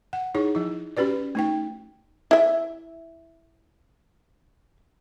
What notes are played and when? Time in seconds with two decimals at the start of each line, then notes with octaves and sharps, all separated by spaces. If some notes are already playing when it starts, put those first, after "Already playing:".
0.13 F#5
0.35 D#4 E4 G#4 C#5
0.55 F3 E4
0.97 C#4 F#4 G4 B4 D5
1.35 A3 D#4 G5
2.31 E4 E5